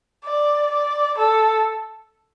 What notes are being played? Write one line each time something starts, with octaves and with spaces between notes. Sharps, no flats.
D5
D5
A4